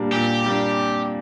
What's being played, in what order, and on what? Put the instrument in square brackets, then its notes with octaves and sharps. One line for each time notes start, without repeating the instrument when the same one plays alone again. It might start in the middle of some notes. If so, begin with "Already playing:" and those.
Already playing: [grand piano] A#2 G3 A#3 D4
[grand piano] A#2 [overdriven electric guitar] G4
[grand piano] G3 A#3 D4